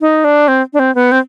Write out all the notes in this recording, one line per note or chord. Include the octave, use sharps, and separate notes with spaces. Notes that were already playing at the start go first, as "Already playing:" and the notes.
D#4
D4
C4
D4
C4
B3
C4